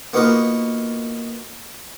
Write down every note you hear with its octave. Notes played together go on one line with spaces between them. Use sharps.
A#3 B3 D#4 F4 F#4 A#4